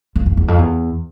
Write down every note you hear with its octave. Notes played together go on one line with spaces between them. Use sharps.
F2
F2
E2
F2
E2